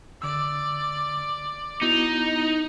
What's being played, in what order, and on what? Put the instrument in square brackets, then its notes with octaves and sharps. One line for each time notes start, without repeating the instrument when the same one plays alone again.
[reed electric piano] D3 E6 [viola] D5
[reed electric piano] B3 E4 F#4 [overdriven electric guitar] D#4